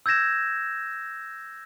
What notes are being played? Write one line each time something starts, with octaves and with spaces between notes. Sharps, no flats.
E6 G6 G#6 A#6 E7